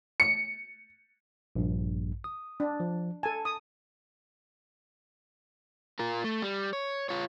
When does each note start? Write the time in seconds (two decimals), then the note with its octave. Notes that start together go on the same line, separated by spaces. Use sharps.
0.20 C#7
1.56 A#1 G2
2.24 D#6
2.60 D4
2.80 F3
3.23 A4 G#5 A5
3.45 D#6
5.99 F4 A#4
6.24 A3
6.42 G3
6.73 C#5
7.09 F4 C#5